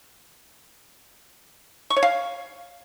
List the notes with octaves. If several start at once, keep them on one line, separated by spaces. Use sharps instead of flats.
C#6
C#5
F5